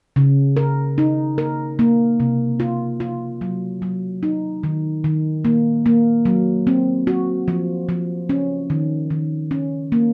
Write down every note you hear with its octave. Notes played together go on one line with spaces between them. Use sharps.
C#3
A#4
D#4
A#4
A#3
C3
F4
F4
F#3
F#3
D#4
D#3
D#3
A#3
A#3
F#3
C4
F#4
F3
F3
C#4
D#3
D#3
C#4
A#3